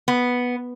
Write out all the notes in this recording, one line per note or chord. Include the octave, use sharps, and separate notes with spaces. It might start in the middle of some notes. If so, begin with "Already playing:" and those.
B3